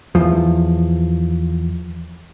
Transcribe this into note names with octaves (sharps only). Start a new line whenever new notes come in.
E2 F3